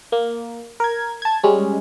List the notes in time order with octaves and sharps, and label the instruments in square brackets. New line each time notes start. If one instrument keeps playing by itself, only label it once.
[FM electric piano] A#3
A#4 G#6
A5 G#6
G3 G#3 C#4